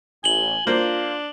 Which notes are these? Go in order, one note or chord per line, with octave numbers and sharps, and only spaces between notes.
A1 G#5 F#7 G7
A#3 D4 F4 C5